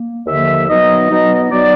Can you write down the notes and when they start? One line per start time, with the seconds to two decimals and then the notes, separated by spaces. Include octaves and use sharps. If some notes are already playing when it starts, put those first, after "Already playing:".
Already playing: A#3
0.27 D#2 D3 F3 A#3 E5
0.68 B2 F#3 B3 D#4 D#5
1.09 B2 F#3 B3 D#4
1.49 B2 F#3 B3 D#4 D5